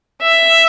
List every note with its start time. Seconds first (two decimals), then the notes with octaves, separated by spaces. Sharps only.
0.22 E5